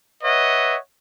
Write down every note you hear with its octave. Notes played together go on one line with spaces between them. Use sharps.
B4 C#5 D#5 E5 F#5